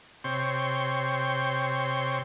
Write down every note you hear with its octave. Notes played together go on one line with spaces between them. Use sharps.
C3 C#5 G5 C6